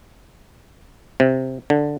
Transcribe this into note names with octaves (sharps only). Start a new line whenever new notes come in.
C3
D3